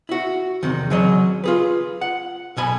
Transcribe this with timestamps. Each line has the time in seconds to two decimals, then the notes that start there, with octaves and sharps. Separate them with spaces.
0.09 E4 F#4
0.63 E2 G#2 C3 D#3
0.90 C#3 F#3 C#5 D#5
1.44 F4 G#4 B4
2.01 F#5
2.57 B1 B2 G#5 B5